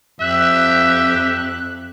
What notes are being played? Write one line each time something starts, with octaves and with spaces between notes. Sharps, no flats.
F2 G4 E5 F#6